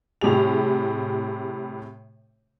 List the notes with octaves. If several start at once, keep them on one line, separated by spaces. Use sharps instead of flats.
A2 C3 G3 G#4 F7